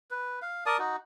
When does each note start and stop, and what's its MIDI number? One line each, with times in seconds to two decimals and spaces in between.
0.11 0.40 71
0.42 0.64 77
0.66 0.77 70
0.66 0.77 74
0.66 0.77 81
0.66 0.77 87
0.79 0.96 63
0.79 0.96 66